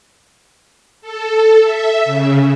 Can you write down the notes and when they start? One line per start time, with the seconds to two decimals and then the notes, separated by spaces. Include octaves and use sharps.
1.01 A4
1.64 E5
2.05 C#3